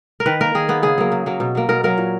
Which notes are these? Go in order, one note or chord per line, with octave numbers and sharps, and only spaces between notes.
A#4
D#3 B4
A#3 A#4
D#3 G#4
A#3 B3
C#3 G#4
F#3 A#3
C#3
F#3 A#3
B2
F#3 A#3
B2 A#4
F#3 A#3 A#4
A#2